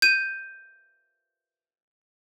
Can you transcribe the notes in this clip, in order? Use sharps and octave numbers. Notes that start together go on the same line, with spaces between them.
G6 D#7